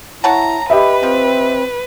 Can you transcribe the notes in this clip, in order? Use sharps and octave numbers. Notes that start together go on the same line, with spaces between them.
E4 C#5 F#5 A5 A#5
G4 B4 D#5 E5 B5
F3 C4